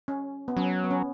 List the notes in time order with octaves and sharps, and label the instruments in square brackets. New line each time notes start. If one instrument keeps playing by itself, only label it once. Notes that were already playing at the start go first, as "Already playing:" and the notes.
[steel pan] C#4
B3
[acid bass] F#3 [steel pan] C#4
[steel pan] B3
C#4